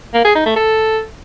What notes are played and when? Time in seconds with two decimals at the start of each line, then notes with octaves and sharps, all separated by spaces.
0.14 A#3
0.25 G#4
0.35 D#4
0.46 A3
0.56 A4